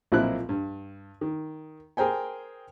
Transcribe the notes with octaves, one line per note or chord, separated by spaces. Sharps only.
B1 A#2 F3 C4 E4 F#6
G2
D#3
G#4 A#4 C5 G5 G#5